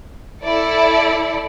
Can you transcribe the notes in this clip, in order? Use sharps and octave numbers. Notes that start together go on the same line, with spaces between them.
E4 A4 D5